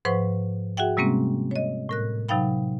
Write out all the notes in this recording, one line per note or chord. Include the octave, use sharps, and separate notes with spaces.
G#2 F3 B4 C5 F#5 C#6
F#4 G#4 E5 F#5 G5
C3 G3 G#3 A#3 C4 C#4
C#5 D#5
A2 A#4 F#6
C3 F#3 D#4 F5 G5 B5